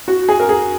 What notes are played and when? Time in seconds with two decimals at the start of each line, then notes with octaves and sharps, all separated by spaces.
0.08 F#4
0.29 G#4
0.40 A#4
0.49 G#4